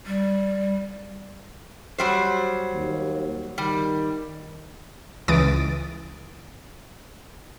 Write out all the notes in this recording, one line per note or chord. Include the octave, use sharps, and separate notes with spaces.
G3
F#3 G3 C5
D#2
D#3 G3
C#2 E3 D#6 A6 D7